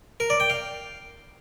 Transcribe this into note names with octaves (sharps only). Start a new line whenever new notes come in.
A#4
D5
G5
F5